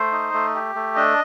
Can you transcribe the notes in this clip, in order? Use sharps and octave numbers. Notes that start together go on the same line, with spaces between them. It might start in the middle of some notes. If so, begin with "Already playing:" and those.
Already playing: A3 C5
D#4
A3
G4
A3
D4 D#5